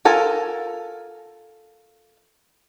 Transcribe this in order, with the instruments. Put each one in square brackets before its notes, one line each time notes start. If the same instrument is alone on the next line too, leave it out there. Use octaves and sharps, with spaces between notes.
[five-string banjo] F4 A4 A#4 G#5